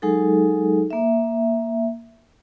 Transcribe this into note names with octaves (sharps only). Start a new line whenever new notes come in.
F#3 G#3 D#4 G#4 A4
A#3 E5